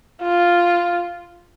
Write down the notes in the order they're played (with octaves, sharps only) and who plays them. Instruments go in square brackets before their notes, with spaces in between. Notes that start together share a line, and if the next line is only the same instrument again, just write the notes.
[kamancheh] F4